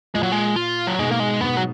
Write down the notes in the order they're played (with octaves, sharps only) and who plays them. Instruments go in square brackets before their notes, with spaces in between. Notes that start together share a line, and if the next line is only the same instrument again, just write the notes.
[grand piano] A#2 [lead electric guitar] G#3
[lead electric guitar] F#3
G#3
F4
F#3
[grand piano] G#2 B2 [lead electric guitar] G#3
[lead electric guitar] A#3
G#3
[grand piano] G#2 B2 [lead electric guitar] B3
[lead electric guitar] F#3